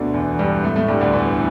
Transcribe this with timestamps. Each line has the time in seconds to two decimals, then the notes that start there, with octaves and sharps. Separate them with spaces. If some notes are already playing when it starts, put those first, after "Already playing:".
Already playing: D2 B2 D3
0.14 E2 E3
0.39 G2 G3
0.64 A2 A3
0.76 A2 A3
0.88 G2 G3
1.01 D2 D3
1.13 E2 E3